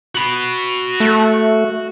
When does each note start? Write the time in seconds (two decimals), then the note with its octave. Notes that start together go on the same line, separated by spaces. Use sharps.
0.15 F#4 B5
1.00 A3